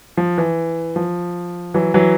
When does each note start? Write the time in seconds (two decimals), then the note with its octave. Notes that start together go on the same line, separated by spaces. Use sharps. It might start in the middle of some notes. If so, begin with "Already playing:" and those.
0.17 F3
0.38 E3
0.96 F3
1.74 E3 F#3
1.94 E3 F#3